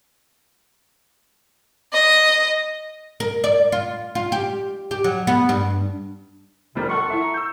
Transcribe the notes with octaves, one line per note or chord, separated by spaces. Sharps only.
D#5
A#4
D5
F4
F4
G4
G4
F#3
B3
G2
F1 F2 C3 G3 A#4
A4 F#5 C6 C#6
E4 A4 E5
A#5
E6 G6